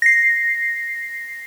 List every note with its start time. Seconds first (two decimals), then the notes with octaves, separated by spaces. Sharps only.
0.02 A#6 C7